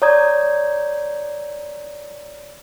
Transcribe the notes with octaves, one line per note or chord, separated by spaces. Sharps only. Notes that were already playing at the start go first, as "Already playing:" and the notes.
C#5 D5 A#5 D#6 G6 G#6